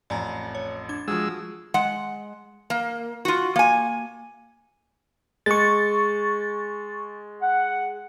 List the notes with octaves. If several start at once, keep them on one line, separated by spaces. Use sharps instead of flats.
A1 F2 D5 G#5 A#5
C#5
D4 G#6
F3 G#3 F#4 E6
G#3 F#5
A#3
F4 F#4
A#3 G#5
G#3 C#6 A6
F#5